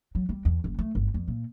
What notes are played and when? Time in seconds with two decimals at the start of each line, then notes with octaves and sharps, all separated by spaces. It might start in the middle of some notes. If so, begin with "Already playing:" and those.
0.15 F#3
0.29 G3
0.45 E2
0.64 F#1
0.79 A3
0.95 G1
1.14 F2
1.28 A#2